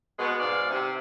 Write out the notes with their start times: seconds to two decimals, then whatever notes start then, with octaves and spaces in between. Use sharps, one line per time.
0.19 B2 G#3 B3
0.40 G#2 D5 F5
0.70 C3